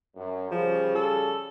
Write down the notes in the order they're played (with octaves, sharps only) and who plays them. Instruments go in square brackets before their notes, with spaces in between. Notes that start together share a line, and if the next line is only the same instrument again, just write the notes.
[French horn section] F#2
[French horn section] C#3 G3 G#4 [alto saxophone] F3
[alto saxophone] A4